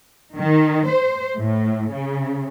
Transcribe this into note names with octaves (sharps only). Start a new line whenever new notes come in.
D#3
C5
A2
C#3